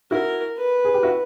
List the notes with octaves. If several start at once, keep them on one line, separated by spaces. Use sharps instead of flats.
E4 F#4 A#4
B4
G#4
G4
E4 F#4